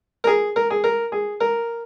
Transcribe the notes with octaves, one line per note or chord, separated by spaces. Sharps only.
A#4
G#4
A#4
G#4
A#4
G#4
A#4